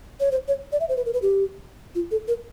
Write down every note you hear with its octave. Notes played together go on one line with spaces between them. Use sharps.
C#5
C5
C#5
D5
E5
C5
B4
A#4
B4
G4
F4
A4
A#4